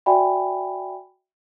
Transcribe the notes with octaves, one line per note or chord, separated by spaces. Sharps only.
F#4 D5 E5 G5 G#5 B5